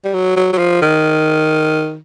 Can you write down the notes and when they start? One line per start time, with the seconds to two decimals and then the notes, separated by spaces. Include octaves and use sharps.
0.05 G3
0.14 F#3
0.36 F#3
0.53 F#3
0.58 F3
0.82 D#3